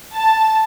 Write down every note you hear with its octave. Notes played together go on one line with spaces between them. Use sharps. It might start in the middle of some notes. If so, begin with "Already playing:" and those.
A5